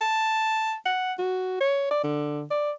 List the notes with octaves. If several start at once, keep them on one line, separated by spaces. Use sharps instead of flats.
A5
F#5
F#4
C#5
D5
D3
D5